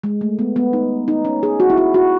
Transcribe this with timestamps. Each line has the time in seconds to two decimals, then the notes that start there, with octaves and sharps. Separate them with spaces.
0.04 G#3
0.21 A3
0.39 B3
0.56 B3
0.73 D#4
1.08 D#4
1.25 C#4
1.43 G#4
1.60 F#4
1.70 E4
1.77 F#4
1.94 F#4